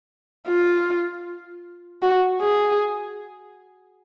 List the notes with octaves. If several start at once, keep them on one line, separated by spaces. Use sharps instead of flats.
F4
F#4
G#4